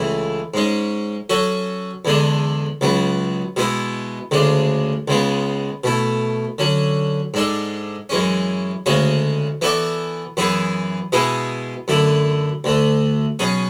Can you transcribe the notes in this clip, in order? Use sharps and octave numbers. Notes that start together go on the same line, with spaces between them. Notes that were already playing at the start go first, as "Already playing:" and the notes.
Already playing: C#2 C#3 E3 A3 E4
G#2 G#3 C#4
F#3 C#4 F#4 A4
E2 D3 G#3 D4
C#2 C#3 F#3 B3
B2 G#3 B3 E4
D2 C#3 G#3 D4
C#2 C#3 G#3 B3
B2 A3 E4
D3 F#3 C#4
G#2 G#3 D4 A4
F#2 E3 G#3 C#4
D2 C#3 G#3 C#4 F#4
E3 B3 F#4 A4 D5
F#2 E3 B3 E4 G#4
B2 G#3 B3 E4 G#4
F#2 D3 A3 E4
D2 D3 A3
B2 F#3 C#4 G#4